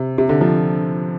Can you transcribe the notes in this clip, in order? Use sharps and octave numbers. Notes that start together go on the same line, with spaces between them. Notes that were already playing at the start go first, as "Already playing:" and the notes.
Already playing: C3
C3
D3
F3